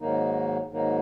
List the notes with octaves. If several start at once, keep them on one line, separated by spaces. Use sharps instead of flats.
G#2 D#3 F#3 A#3 D#4
G#2 D#3 F#3 A#3 D#4